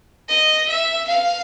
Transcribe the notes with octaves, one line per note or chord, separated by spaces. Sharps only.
D#5
E5
F5